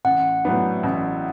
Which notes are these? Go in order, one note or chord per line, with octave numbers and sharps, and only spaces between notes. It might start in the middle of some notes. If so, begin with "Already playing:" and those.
A1 F#5
A2 F#3 B3 D4
A1